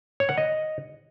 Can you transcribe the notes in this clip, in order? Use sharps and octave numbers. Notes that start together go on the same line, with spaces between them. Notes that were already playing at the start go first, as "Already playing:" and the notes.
C#5
F#5
D#5